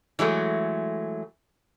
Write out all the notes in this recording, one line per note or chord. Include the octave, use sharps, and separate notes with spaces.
E3 F#3 G#3 A3